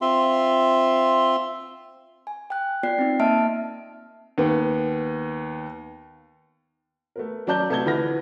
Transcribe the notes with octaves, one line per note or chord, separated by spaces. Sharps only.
C4 F4 E5 C6
G#5
G5 F#6
B3 F4 D5 G5 C7
C4 D#4
A#3 D#5 E5 A5 F6 D7
D#2 B3
A3 B3 A#4
F#3 C#4 D5 A5 G6 G7
C2 A3 B3 A5 G#6 G7
D2 E3 F3 B4 F6 A#6